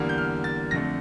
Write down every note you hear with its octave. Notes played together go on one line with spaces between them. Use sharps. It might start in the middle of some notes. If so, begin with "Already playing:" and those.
Already playing: E2 D3 G3 A#3
G6
F6
A6
F2 D3 A3 A#6